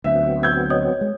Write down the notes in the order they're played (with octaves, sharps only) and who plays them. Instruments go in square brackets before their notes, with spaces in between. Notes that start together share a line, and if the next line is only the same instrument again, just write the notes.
[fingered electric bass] D2 [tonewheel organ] F#3 B3 C4 [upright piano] E5
[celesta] E6 [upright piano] G6 G#6
[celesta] C#5 D#5 D#6
[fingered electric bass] G#3